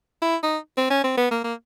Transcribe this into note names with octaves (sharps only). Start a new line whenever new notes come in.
E4
D#4
C4
C#4
C4
B3
A#3
A#3